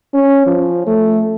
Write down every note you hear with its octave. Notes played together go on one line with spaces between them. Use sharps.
C#4
F3
A3